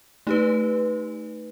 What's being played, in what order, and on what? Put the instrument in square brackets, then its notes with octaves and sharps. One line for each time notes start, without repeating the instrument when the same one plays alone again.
[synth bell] A3 D#4 G4 B4